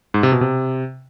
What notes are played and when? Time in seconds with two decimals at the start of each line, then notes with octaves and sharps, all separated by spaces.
0.14 G#2
0.23 C3
0.32 B2
0.41 C3